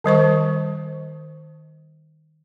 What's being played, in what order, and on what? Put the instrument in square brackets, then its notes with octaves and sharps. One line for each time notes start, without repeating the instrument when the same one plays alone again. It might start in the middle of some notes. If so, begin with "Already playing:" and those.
[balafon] D#3 G3 C5 C#6